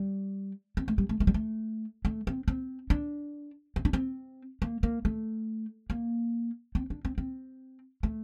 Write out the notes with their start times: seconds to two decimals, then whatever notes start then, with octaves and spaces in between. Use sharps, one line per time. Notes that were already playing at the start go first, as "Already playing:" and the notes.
Already playing: G3
0.77 C4
0.88 A3
0.98 G3
1.09 A3
1.20 A3
1.27 G3
1.34 A3
2.05 A3
2.27 C4
2.48 C4
2.90 D4
3.76 C4
3.85 D4
3.93 C4
4.62 A#3
4.83 A#3
5.05 A3
5.90 A#3
6.75 C4
6.90 D4
7.05 C4
7.18 C4
8.03 A3